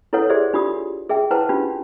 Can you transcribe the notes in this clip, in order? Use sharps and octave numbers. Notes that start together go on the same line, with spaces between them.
E4 A4 B4 C#5 F#5
G4 G#4 C5 D5 E5
D4 F4 G4 D#6
G#4 E5 G5
E4 B4 C5 F#5 G5 A5
C#4 D4 F4 G4